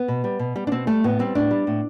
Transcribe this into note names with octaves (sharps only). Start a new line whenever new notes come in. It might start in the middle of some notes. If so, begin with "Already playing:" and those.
Already playing: B3
B2
G3
B2
G3
D4
B2 C4
G3 A3
A2 B3
G3 C4
A2 D4
G3
A2